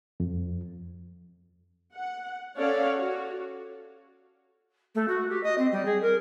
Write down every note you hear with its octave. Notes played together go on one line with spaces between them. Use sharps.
F2
F#5
C#4 A4 C#5 D5 F5 F#5
F#4
A3
F#4
G4
D#5
C4
G3
G#4
A#4